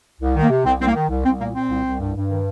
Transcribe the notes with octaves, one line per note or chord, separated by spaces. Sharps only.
C2
D#3
A#3
C3
C2 C4
C2 C4
A#3
D#3
C2
C2 C4
A#2 A#3
A#2 C4
C2
C2
G2
G2
D#3